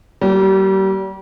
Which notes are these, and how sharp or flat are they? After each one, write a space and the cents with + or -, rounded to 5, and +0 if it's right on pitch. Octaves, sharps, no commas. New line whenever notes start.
G3 -35 A#3 +0